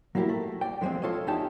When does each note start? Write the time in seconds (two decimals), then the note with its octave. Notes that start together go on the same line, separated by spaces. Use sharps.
0.15 F#3 A#3 E4 G4 A#4
0.29 A3
0.61 D5 G5
0.81 D3 F3 F#3 G#3 C4
1.02 F4 A4 C#5 D#5
1.27 E2 E3 D#4 G4 G5 A5